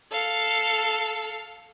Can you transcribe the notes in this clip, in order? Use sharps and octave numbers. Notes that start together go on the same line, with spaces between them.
A4 F5